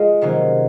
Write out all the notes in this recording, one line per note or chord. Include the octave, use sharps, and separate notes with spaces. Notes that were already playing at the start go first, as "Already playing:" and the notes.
Already playing: G#3 F4
C3 D#3 F#3 A#3 C#4